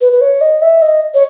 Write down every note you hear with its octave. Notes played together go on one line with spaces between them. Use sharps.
B4
B4
C#5
D#5
E5
D#5
C#5